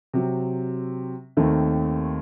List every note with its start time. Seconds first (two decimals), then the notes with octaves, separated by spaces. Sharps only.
0.14 C3 F#3 C4
1.37 D#2 D#3 A3 C4